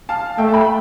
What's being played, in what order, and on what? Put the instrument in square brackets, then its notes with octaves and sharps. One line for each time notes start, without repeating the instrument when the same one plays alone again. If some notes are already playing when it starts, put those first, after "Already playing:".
[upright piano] F5 A5
[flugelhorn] A3 [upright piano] E5 G5
[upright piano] A5
G5 B5